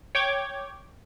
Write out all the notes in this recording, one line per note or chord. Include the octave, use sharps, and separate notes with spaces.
C#5 G5 D6 G#6